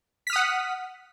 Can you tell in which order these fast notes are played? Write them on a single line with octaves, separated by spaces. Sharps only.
B6 F6 D#6 F#5